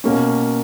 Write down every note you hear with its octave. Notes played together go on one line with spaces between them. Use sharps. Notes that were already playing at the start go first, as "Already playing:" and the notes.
B2 A#3 C#4